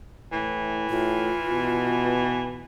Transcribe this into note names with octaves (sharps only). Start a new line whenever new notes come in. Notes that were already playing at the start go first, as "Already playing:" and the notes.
A2 E3
A2 F4
B2